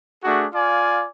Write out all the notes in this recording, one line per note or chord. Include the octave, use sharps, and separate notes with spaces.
A3 D4 F#4 G#4
F4 D5 F5 G#5